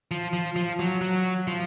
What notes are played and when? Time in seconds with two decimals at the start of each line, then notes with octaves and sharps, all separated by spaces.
0.11 F3
0.33 F3
0.56 F3
0.80 F#3
1.01 F#3
1.47 F3